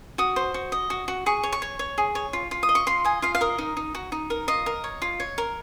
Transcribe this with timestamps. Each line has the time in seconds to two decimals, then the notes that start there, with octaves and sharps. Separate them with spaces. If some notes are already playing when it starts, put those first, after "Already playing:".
0.18 F#4 D#6
0.36 C5
0.54 F#4
0.72 D#5
0.90 F#4
1.08 F#4
1.26 G#4 C#6
1.43 C#5
1.53 C#6
1.62 C#5
1.79 C#5
1.98 G#4
2.15 C#5
2.33 F4
2.51 F4
2.63 D#6
2.69 D#5
2.75 C#6
2.87 F4 C6
3.04 D#5 G#5
3.22 F4 F5
3.35 F5
3.41 A#4 D#5
3.58 D#4
3.77 D#4
3.95 F#4
4.12 D#4
4.30 A#4
4.48 F4 D#5
4.66 A#4
4.84 C#5
5.02 F4
5.20 C#5
5.38 A#4